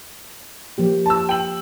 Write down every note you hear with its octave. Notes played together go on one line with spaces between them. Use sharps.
F3 A#3 G4
A5 E6
G5 F#7